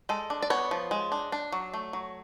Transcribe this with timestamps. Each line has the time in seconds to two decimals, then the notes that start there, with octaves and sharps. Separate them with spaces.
0.09 G#3 A4
0.30 D4
0.42 D5
0.50 B3 C#5
0.71 F3
0.91 G#3
1.12 D4
1.32 D4
1.52 F#3
1.74 A3
1.93 F#3